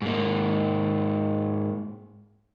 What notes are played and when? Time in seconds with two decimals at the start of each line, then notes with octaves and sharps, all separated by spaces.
0.02 G#2 A#3